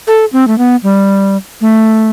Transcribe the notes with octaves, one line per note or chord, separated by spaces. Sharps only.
A4
C4
A3
B3
G3
A3